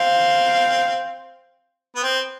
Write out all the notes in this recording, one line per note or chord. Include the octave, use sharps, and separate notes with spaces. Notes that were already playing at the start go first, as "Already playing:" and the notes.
Already playing: C4 F5
B3
C4